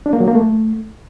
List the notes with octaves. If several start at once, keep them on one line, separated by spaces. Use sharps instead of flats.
D4
A#3
F#3
A#3
A3